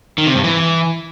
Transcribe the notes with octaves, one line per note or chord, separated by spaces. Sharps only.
D#3
C3
G2
E3